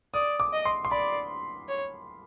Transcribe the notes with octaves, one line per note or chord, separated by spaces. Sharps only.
D5 D#6
D6
D#5
C6
C6
D5 B5
C#5